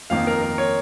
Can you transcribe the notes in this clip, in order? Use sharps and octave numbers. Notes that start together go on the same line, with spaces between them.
F2 D#3 A#3 F5
A#4
A#4
C#5